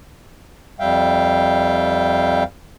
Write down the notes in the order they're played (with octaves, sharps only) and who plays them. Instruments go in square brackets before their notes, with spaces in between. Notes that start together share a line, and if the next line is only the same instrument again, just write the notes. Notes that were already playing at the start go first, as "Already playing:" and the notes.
[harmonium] F2 G3 E5 F5 G5